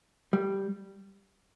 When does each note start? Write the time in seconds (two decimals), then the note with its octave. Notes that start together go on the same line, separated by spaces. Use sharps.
0.33 G3